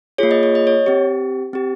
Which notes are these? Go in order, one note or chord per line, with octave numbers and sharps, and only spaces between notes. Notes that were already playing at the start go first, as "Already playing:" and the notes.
A#3 F4 G#4 C#5
D#5
C#5
D#5
C#5
C4 G4
C4 G4